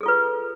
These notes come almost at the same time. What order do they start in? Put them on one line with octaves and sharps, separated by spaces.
G#4 A4 F4 B4